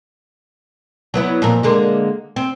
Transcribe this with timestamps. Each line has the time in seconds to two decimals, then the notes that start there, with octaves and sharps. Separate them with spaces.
1.14 F#3 B3 E4
1.42 F2 A#2 A#4
1.63 D3 G#3 A#3
2.36 C4